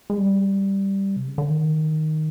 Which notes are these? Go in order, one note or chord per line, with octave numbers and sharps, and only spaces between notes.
G#3
G3
C3
C#3
D3
D#3